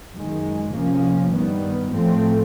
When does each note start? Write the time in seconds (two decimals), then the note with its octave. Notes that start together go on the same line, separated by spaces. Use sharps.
0.13 F#2 D#3 G#3
0.73 C3 F3 A#3 C#4
1.33 G2 D#3 G3 B3
1.93 A2 F3 A3 C4